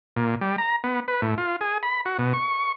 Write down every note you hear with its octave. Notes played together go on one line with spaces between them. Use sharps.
A#2
G3
A#5
B3
B4
A2
F4
G#4
B5
F#4
B2
C#6